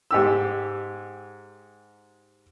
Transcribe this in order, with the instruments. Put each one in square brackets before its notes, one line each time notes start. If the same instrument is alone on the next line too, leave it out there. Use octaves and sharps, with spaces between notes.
[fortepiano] G#2 G4 E6